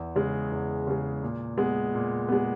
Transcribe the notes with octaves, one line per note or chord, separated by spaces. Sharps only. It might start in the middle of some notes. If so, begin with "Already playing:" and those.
Already playing: E2
C#3 G#3
E2
C#3 G#3
A#2
G#3 B3
A#2
G#3 B3